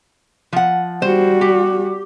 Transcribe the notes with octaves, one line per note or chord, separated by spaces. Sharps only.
F3 F#5
G3 F#4 C5
G4